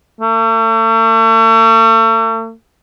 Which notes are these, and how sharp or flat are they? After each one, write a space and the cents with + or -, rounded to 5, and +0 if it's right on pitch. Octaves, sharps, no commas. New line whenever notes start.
A3 +40